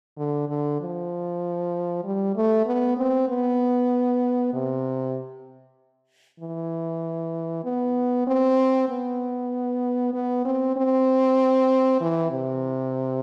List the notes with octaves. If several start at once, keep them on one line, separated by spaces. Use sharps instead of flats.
D3
D3
F3
G3
A3
B3
C4
B3
C3
E3
B3
C4
B3
B3
C4
C4
E3
C3